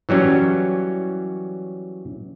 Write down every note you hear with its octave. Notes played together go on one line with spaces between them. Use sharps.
E3 F#3 G3 C#4